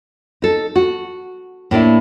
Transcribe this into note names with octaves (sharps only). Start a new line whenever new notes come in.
D#4 A4
F#4
A2 A#3 D4 E4